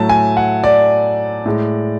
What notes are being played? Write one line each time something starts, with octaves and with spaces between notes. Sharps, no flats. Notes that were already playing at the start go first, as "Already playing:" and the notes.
Already playing: A2 F#3 A3 A5
G#5
F#5
D5
A2 G#3